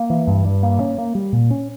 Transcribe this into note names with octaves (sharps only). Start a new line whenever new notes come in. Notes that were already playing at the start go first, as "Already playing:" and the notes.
Already playing: A#3
E3
G2
G2
A#3
C#4
A#3
G3
A#2
C#4